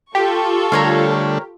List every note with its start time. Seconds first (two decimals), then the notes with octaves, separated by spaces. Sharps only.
0.15 F4 G4 A4 C#6
0.72 D3 G3 A3 A#4 C#5 F5